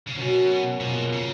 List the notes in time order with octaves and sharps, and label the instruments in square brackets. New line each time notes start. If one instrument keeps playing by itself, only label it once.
[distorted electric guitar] C#3
[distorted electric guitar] B2 [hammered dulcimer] F#3 C#4 F#4 A#4
[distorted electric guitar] B2 [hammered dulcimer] F3 A#3 F4 G#4
[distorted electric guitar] C#3